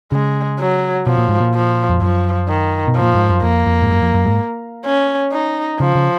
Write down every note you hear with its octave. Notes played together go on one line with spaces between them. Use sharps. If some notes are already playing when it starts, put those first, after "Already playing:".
C#3 G#3
F#3
B2 F3
A#2
G#2
A#2
F3
F2
F#2 F3
D#3
B2
F3
A#2
G#2
F#2
F2 A#3
F2
G#2
F#2
F2
F#2
G#2
C#4
D#4
C#3 F3
C#3